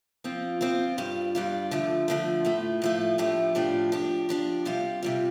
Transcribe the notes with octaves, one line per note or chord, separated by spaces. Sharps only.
F3 C4 F4
F3 C4 F4
G2 G3 F4
G2 G3 F4
D3 F3 A3
D3 F3 A3
A2 F3 A3
A2 F3 A3
A2 F3 A3 D4 G4
A2 F3 A3 D4 G4
F3 D4 G4
F3 D4 G4
C3 G3 F4
C3 G3 F4